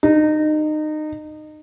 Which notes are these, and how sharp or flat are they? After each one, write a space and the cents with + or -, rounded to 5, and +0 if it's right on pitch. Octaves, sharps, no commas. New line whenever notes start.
D#4 -25